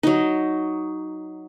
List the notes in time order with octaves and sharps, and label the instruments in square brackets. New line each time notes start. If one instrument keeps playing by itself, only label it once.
[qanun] F#3 D#4